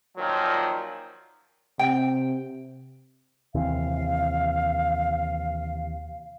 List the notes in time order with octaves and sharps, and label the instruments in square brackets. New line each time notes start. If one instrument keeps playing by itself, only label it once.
[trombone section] A#2 D#3 F3 F#3
[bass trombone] C3 [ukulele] G5
[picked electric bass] D#2 C3 E3 [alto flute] F5